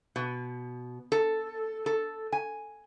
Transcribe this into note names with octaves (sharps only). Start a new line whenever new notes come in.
B2
A4
A4
G#5